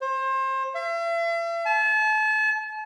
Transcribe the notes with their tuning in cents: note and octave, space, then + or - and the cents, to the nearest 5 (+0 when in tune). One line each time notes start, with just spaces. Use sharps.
C5 +30
E5 +40
A5 -35